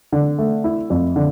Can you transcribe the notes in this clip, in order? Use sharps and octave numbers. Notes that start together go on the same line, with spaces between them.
D3
A3
E4
F2
D3